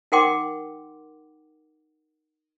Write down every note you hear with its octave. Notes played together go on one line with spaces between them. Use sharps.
D#4 A#4 F#5 G5 C6 D6